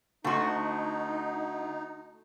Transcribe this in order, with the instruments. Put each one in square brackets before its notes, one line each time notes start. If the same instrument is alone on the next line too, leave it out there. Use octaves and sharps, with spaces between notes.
[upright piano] D2 C6 C#6 [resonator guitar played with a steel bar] A3 F#4 [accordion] D#4